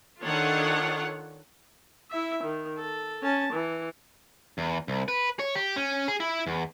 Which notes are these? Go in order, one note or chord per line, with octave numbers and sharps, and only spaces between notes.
D#3 D4 F4 A4 C#5 F#5
E4 E5
D#3
A4
C#4 A5
E3
E2
C2
B4
C#5
G4
C#4
G#4
E4
E2